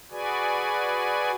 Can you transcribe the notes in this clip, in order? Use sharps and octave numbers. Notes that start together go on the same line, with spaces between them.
F#4 G#4 B4 D5 G#5